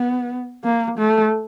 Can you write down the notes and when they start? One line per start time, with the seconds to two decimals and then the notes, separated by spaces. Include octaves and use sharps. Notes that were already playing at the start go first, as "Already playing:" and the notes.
Already playing: B3
0.64 A#3
0.98 A3